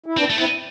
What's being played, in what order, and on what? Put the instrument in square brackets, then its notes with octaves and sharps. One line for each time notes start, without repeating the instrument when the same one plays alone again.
[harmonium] E4
[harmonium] B3 D4 [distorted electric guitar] C4
[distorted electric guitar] A3
[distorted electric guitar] B3 [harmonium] C4 E4